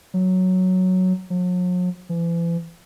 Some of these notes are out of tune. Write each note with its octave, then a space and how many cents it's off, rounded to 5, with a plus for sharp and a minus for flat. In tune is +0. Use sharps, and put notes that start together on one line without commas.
F#3 +0
F#3 -45
E3 +40